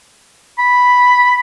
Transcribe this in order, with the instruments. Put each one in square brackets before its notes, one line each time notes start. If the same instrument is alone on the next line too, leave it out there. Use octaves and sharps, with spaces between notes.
[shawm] B5